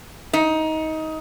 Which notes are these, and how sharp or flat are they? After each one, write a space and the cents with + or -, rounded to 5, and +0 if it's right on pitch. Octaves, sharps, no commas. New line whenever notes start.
D#4 +20